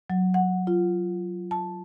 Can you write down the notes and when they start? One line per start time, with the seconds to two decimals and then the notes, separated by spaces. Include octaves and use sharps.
0.10 F#3
0.34 F#5
0.67 F4
1.51 A5